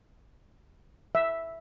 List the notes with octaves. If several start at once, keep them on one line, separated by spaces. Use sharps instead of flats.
E5